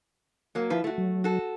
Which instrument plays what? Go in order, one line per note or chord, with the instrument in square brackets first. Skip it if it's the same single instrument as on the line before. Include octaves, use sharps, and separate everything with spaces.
[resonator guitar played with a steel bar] F#3 A#3
[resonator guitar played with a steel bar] F3 B4 [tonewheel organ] E4
[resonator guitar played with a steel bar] A3 F#4
[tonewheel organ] F#3
[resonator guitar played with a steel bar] F#4 A4